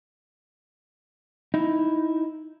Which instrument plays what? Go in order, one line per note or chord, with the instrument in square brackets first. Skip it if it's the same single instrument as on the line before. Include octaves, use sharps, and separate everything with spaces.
[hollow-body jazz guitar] D#4 E4